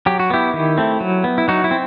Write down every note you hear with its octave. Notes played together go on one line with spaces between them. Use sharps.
F#3 G4
F#4
B3 E4 G4
D#3
A3 C4
F#3
B3
E4
F#3 D#4 F#4
E4
C4